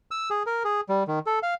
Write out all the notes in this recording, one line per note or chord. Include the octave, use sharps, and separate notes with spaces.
E6
G#4
A#4
G#4
G3
D#3
A4
F5